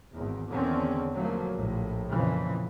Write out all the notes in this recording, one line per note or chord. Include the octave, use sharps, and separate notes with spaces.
G#1 E2
E2 D3 D#3 C4 C#4
F3 F#3 A3 A#3
A#1 A2
F2 A#2 C#3 E3